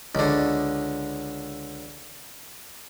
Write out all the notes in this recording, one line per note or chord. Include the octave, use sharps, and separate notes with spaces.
C#2 D3